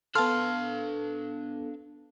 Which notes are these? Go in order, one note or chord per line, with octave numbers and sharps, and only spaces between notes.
B3 D4 A4 F5 A5 C6 F6